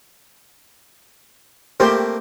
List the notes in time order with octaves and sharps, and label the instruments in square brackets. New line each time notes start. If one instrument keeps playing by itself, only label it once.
[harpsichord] A3 A#3 C4 [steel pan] G4 C5